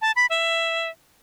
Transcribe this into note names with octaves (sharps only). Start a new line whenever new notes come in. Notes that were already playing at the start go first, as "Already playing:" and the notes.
A5
B5
E5